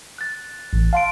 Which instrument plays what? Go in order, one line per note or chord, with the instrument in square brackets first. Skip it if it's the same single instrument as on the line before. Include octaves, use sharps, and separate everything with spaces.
[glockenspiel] F#6 A6
[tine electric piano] A1
[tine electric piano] F5 [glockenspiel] A5 C6 D7